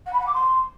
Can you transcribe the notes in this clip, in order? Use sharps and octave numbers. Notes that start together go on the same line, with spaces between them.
F#5
B5
F#5
D6
C6